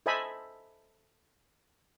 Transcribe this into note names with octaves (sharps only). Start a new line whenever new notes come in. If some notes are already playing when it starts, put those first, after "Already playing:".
A4 C5 D#5 E5 G#5 B5